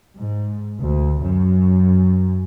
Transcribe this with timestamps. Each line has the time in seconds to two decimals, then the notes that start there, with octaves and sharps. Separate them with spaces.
0.17 G#2
0.81 D2
1.23 F#2